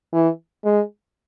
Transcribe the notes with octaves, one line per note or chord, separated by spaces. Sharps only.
E3
G#3